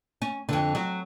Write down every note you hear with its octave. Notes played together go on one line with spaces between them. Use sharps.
C#4
F2 D3
F#3